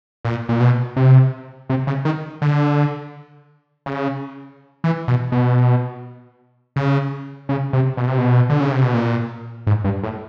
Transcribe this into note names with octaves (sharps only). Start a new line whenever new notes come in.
A#2
A#2
B2
C3
C3
C#3
D#3
D3
C#3
E3
B2
B2
C#3
C#3
C3
B2
C3
B2
D3
C#3
C3
B2
A#2
G#2
G2
A2